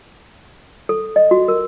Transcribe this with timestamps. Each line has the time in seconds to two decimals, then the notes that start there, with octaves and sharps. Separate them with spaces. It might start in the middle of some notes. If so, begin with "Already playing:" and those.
0.89 A4
1.16 D#5
1.31 F#4
1.48 A#4